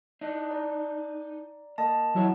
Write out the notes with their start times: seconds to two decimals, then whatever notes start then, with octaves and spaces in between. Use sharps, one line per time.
0.21 D4 D#4 D#5
0.50 D5 A#5
1.78 A#3 D#5 A5
2.15 E2 F#3 E4 C#5